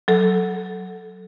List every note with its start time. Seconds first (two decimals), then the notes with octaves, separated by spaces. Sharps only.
0.08 F#3 A4